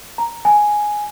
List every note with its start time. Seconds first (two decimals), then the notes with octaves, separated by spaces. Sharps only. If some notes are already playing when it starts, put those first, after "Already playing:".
0.18 A#5
0.45 G#5